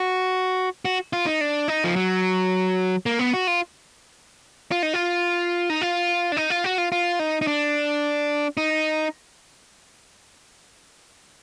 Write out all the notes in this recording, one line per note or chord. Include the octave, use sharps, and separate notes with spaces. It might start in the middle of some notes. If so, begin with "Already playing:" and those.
Already playing: F#4
F#4
F4
D#4
D4
D#4
F3
F#3
A#3
B3
F#4
F4
F4
D#4
F4
D#4
F4
D4
D#4
F4
F#4
F4
F4
D#4
D#4
D4
D#4